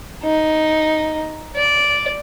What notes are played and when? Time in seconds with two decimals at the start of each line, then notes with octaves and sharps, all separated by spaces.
0.23 D#4
1.56 D5